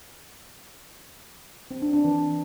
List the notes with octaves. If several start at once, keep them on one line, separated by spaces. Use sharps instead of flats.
C4
D4
D4
E3